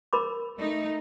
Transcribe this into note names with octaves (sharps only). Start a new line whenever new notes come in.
A#4 B5 D6
A3 D#4